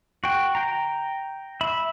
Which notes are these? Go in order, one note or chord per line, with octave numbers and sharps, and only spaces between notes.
F#4 G5
G5 A#5
E5 B5